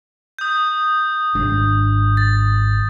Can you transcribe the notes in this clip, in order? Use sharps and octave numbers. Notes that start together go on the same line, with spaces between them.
D#6 G6
G#1 G#3 D4
A6